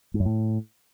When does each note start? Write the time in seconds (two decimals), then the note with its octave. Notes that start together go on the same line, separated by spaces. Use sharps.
0.14 G#2
0.20 F#2
0.25 A2